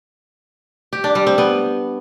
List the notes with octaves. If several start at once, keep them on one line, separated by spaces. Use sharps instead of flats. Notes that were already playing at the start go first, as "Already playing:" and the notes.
G4
D4
G3
C4
B3